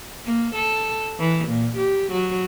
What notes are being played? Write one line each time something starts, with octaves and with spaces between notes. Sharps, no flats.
A#3
A4
E3
A#2
G4
F#3